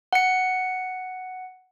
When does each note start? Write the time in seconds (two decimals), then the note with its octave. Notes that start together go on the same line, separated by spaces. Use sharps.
0.13 F#5 C#7